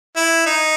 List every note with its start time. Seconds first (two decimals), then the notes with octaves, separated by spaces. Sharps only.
0.17 E4
0.46 D#4